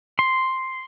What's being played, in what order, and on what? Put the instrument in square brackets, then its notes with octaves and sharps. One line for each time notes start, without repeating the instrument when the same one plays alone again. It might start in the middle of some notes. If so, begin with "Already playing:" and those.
[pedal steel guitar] C6